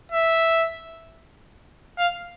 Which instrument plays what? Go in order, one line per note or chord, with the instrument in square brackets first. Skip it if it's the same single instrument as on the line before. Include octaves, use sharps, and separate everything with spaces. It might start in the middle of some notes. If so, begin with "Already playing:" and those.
[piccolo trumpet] E5
F5